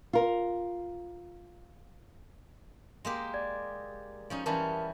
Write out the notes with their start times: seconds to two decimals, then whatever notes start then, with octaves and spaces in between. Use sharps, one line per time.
0.13 F4 A#4
3.05 G#3 A#3 G4
3.34 D5 G#6
4.30 F3 C#4 D#4
4.46 E3 G3 C#4 A#4 A5